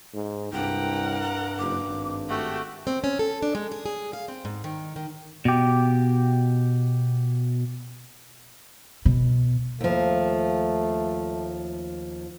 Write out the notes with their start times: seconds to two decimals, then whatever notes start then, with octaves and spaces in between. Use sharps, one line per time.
0.14 G#2
0.53 C2 G2 A#4 F#5 G5
1.22 A#5
1.59 F#1 D6
1.88 G#1
2.29 A3 F#4 G4
2.87 C4
3.04 C#4
3.19 A4
3.42 D4
3.55 G#3
3.72 G#4
3.86 G#4
4.13 F5
4.28 C4
4.45 G#2
4.64 D#3
4.96 D#3
5.45 B2 G4
9.05 B2
9.81 D#2 F3 A3